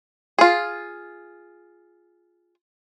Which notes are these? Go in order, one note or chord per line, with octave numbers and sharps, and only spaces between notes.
F4 G#4